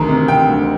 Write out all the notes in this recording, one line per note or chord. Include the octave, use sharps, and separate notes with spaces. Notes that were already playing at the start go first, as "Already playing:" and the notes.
Already playing: D2 D#3 G#3 A#5
C3
C3 G5
D2